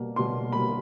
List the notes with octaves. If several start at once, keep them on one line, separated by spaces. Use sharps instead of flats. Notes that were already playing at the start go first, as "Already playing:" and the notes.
Already playing: B2 G3 A#3
B2 G3 A#3 C6
B2 G3 A#3 B5